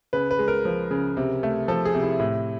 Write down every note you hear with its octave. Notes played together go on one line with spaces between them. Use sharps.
C#3 B4
B4
G#3
A#4
F3
C#3
C3
A3
F3 A4
G#4
C3
E4
A2